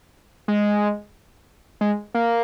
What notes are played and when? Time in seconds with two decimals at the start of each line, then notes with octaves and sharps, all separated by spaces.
0.48 G#3
1.81 G#3
2.15 A#3